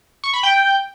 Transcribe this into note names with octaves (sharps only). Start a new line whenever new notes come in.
C#6
B5
G5